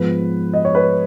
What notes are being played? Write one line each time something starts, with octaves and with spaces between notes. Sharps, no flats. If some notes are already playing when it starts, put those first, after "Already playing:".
Already playing: G#2 F3 B3 B4
D#5
C#5
B4